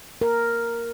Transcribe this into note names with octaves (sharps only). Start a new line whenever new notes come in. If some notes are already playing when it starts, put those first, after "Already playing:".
A#4